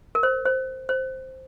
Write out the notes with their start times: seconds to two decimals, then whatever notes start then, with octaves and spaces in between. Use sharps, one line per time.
0.15 A#4
0.23 C5
0.45 C5
0.89 C5